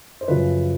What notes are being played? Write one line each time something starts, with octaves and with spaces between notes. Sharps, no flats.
C5
F#2 C#3 F3 B4